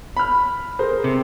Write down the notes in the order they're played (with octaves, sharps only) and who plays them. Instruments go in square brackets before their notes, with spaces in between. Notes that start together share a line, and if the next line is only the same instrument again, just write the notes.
[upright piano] B5 F6
G#4 A#4 C5
[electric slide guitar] C3